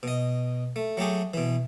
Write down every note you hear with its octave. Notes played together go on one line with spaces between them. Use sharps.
B2 D#5
A3
F#3 A3 G4 G#4
B2 E3